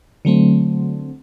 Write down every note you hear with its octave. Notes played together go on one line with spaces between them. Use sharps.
D3 F#3 A3 C4